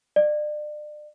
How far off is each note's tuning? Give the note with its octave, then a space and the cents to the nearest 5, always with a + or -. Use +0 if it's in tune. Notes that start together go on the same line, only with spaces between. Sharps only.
D5 +35